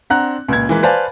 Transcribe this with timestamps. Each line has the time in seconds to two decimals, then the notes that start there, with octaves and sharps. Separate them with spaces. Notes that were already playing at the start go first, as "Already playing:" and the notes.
0.10 C4 D4 F#5 A#5 F#6
0.48 C#2 A#2 G#6
0.69 E3 G#3 A#3 B4
0.83 B4 C5 D5 F5 G#5 A5